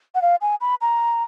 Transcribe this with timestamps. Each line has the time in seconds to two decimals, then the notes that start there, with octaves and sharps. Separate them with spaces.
0.15 F#5
0.22 F5
0.41 G#5
0.61 B5
0.81 A#5